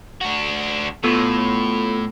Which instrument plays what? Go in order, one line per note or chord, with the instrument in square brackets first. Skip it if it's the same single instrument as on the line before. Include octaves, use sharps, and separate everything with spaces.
[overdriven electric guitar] D4 F#4
[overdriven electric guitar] A2 [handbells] B3 F4 A4